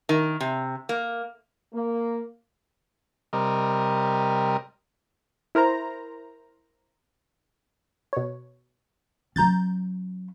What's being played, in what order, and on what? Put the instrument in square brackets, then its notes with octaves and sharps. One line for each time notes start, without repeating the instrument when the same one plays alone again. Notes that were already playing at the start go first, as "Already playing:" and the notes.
[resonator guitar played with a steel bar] D#3
C3
A#3
[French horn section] A#3
[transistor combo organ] C3 G3 A#4 D#5
[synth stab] E4 A#4 C5 A#5
B2 C#5
[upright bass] F#3 C#4 [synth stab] A#5 G6 A6